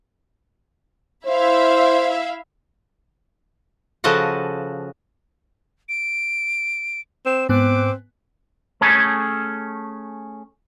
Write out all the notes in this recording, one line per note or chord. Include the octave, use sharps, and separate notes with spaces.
E4 C5 E5 F5
C#3 F3 F#4 A4 D#5 F#5
D7
C4 E7
G#2 B3 C4 D6 F#6
A3 C#4 G#4 A4